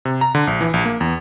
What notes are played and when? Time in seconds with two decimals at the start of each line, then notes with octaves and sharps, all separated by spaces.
0.05 C3
0.21 A#5
0.35 D3
0.47 A#1
0.61 E3
0.74 A#1
0.85 A#3
1.01 E2